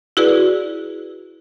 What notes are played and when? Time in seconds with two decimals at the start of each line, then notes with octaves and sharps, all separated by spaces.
0.17 E4 F#4 G#4 B4 D5